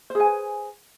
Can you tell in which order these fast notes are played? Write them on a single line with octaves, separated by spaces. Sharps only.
C5 G#4 G#5 B4